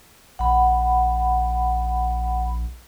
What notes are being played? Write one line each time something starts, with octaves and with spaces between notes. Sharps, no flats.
A#1 F#5 B5